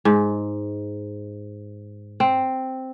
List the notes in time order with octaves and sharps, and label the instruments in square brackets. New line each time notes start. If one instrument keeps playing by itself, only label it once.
[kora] G#2
C4